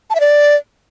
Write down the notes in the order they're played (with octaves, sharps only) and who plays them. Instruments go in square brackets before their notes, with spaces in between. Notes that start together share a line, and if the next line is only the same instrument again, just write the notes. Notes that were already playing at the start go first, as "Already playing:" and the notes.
[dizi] A5
E5
D5